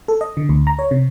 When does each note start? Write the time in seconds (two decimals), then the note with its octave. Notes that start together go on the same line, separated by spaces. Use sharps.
0.08 A4
0.21 D#5
0.37 D3
0.49 D2
0.67 A#5
0.79 C#5
0.91 C3